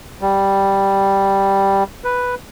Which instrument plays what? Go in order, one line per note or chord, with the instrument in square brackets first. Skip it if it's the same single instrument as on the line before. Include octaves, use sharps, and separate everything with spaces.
[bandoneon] G3
B4